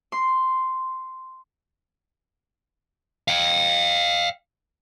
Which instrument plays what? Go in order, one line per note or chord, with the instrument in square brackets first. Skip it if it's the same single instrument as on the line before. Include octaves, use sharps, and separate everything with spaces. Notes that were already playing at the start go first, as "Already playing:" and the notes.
[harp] C6
[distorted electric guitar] F5 G5